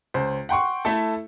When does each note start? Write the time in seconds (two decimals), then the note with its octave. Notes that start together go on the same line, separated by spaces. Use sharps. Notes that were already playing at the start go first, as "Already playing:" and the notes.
0.14 C#2 C5
0.49 F#5 G5 C6 C#6
0.85 A3 E4 A4